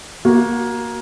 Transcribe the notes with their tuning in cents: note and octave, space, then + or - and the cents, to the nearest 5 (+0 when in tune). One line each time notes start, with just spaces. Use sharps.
A#3 +15 F#4 +0